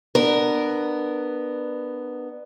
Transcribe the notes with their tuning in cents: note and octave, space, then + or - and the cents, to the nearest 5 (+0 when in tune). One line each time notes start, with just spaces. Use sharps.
B3 +0 D4 +25 A#4 +0